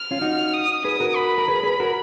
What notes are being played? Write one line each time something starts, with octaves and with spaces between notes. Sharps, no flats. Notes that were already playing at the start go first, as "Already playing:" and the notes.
Already playing: F6
C#4 F4
D#4 F#4
D#6
G#4 B4 D#6
F#4 A#4
B5
A#4
G#4 B4
G#4 B4
F#4 A#4